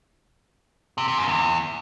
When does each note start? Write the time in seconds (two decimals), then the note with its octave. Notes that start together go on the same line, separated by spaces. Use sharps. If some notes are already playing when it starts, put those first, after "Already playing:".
0.98 C3
1.08 C3
1.18 F#2
1.28 E2